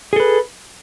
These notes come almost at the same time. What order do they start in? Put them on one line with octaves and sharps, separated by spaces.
G#4 A4 B4